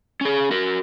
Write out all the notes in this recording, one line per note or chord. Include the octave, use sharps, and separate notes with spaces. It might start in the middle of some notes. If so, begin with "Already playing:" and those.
C#4 G#4
F#4 A#4